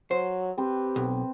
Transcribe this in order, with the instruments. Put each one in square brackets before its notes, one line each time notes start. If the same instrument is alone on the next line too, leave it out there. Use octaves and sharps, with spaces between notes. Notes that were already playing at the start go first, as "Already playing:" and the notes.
[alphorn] F#3 [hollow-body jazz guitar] C5
[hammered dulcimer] C4 B4 [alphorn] G4
[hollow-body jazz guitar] B1